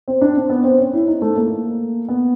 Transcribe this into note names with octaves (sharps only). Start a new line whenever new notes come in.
C4
D4
C4
B3
C4
C#4
E4
D#4
A3
A#3
B3